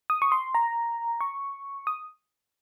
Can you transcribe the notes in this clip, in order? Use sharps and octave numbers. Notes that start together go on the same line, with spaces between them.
D#6
C#6
C6
A#5
C#6
D#6